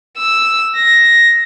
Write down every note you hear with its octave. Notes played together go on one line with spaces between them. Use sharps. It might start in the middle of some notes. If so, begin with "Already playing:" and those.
E6
A#6